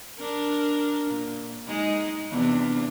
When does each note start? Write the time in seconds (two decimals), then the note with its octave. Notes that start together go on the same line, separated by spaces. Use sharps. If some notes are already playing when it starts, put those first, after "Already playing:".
0.18 D4 A#4
1.11 A#2
1.68 G#3 D#4
2.31 E2 C3 D4